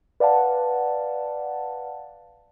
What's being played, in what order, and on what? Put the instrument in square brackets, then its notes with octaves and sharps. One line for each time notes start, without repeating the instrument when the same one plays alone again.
[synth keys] B4 D5 F5 F#5 A5